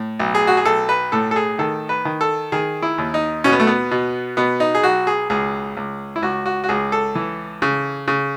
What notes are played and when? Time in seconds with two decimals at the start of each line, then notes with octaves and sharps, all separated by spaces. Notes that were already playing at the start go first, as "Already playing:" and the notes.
Already playing: A2
0.20 B1
0.35 G#4
0.47 F#4
0.57 G#4
0.65 B1 A4
0.89 B4
1.12 A2 A4
1.31 A4
1.36 G#4
1.59 D#3 A4
1.89 B4
2.05 D#3
2.21 A4
2.52 D#3 G#4
2.82 E4
2.98 D#2
3.14 D#4
3.44 B2 C#4
3.52 B3
3.60 A3
3.67 B3
3.91 B2
4.37 B2 B3
4.60 D#4
4.75 G#4
4.83 B1 F#4
5.07 G#4
5.30 C#2 G#4
5.77 C#2
6.16 E4
6.22 C#2 F#4
6.46 F#4
6.64 F#4
6.69 C#2 G#4
6.92 A4
7.15 E3
7.62 C#3
8.08 C#3